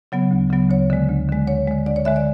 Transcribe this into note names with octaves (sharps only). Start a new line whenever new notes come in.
C#3 F#3 B3
D2
C#3 F#3 B3
D2 C#5
D3 G#3
D2
D3 G#3
D2 C#5
D3 G#3
D2 D5
C#5
D3 G#3 E5
D5